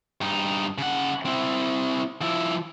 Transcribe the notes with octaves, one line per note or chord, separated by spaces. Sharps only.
G2 D#4
C#3 F#5
C4 E4
F3 E4